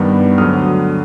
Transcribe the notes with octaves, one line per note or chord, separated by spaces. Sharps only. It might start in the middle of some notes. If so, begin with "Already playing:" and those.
Already playing: G2 D#3 G3 B3
D2 D3 F#3 D#6 F6